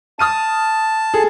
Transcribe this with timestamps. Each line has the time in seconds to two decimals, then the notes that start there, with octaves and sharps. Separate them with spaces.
0.19 A5 D#6 F6 D#7
1.14 G#4 A4